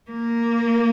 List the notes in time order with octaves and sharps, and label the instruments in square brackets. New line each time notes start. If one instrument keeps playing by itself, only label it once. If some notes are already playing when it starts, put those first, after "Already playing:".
[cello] A#3